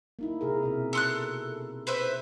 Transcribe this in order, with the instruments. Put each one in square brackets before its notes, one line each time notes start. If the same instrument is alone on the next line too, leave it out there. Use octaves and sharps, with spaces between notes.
[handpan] A#3 D#4 E4
C3 G#4 A#4
B2 E4 E5
[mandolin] A4 C6 F#6
B4 C5 E5